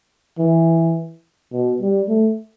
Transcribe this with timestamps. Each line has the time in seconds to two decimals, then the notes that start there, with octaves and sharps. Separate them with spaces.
0.38 E3
1.52 B2
1.81 G3
2.09 A3